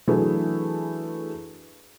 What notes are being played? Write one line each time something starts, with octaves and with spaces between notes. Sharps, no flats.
E3 F#3 A3 D4 G#4 B4